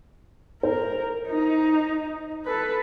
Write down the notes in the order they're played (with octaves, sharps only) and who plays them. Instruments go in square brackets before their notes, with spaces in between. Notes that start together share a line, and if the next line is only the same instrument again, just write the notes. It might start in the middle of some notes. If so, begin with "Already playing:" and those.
[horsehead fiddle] A#4 [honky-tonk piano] C5
[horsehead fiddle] D#4
A4 B4